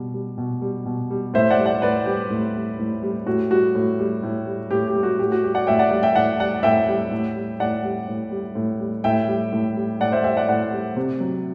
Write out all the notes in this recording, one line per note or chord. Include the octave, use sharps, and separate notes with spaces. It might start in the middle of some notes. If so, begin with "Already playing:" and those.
Already playing: B2 G3
G3
B2
G3
B2
G3
A2 C5 E5
D5 F#5
G3
D5 F#5
A2 B4 D5
G3 G4
A2
G3
A2
G3
A2 F#4
G3 F#4
A2
G3
A2
G3
A2 G4
G4
G3
F#4
A2 G4
F#4
G3 G4
D5 F#5
A2 E5 G5
D5 F#5
G3
E5 G5
A2 D5 F#5
G3 D5 F#5
A2 E5 G5
G3
A2
G3
A2 D5 F#5
G3
A2
G3
A2
G3
A2 E5 G5
G3
A2
G3
A2 D5 F#5
C5 E5
G3 E5 G5
D5 F#5
A2 D5 F#5
G3
C3
F#3